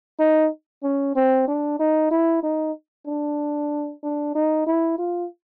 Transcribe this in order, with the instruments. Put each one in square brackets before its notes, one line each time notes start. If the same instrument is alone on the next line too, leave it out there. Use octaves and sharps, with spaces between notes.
[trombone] D#4
C#4
C4
D4
D#4
E4
D#4
D4
D4
D#4
E4
F4